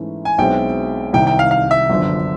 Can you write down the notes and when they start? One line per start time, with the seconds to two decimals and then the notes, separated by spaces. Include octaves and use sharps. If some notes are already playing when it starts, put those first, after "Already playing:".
Already playing: G#2 E3 A3 C#4 E4
0.25 G#5
0.38 B1 B2 G#3 C4 E4 G5
1.13 C2 C3 D#3 G5
1.27 G5
1.39 F5
1.51 F5
1.71 E5
1.89 G1 F#2 D3 F3